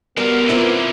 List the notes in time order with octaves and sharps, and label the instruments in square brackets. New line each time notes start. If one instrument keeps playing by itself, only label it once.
[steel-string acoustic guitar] G3 F#4 [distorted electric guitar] G#3 F5 [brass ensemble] B3 [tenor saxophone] A#4
[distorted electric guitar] D3 A#3 [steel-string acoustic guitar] F3 C4 E4